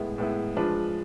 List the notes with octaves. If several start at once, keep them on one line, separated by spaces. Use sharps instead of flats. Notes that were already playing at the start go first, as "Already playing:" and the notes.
Already playing: A2 G#3 B3 E4
A2 G#3 B3 E4
F3 G#3 D4 F4 B4